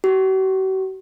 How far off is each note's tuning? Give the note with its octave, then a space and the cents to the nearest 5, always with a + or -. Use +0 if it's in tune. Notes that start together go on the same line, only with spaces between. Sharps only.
F#4 +45